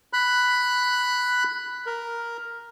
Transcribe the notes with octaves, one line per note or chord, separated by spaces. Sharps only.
B5 F#6
A#4